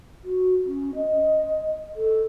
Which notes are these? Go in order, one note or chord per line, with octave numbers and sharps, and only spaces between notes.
F#4
C#4
D#5
A4